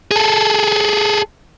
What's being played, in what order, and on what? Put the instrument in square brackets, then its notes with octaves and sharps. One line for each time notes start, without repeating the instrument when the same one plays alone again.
[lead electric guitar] G#4 A4